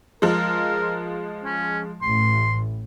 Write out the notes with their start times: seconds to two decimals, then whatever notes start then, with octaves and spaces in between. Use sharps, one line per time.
0.22 F3 G#3 A#4
1.44 C#4
2.02 A1 A2 C6